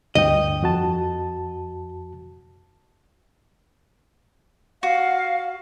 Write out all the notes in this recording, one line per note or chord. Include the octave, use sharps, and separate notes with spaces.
D2 G2 D#5 G5
F2 F#4 A5
F#4 F5